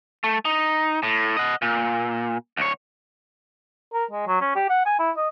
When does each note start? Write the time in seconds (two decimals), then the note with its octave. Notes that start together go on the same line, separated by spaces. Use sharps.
0.24 A3
0.45 D#4
1.03 A2
1.37 D#5 F#5
1.62 A#2
2.57 D2 C#5
3.94 A#4
4.11 G#3
4.27 F#3
4.41 C#4
4.56 G4
4.70 F#5
4.86 G#5
4.99 E4
5.17 D#5